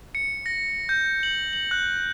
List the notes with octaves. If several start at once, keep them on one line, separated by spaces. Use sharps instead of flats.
C#7
A#6
G6
F#7
F#7
F#6